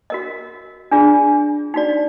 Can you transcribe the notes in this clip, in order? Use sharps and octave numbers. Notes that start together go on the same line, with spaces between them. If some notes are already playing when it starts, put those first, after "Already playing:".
F#4 A#4 D#5
D4 F4 G#4 D5
D#4 F#4 D5